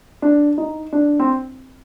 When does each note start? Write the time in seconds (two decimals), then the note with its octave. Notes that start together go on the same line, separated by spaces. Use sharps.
0.22 D4
0.58 D#4
0.93 D4
1.20 C4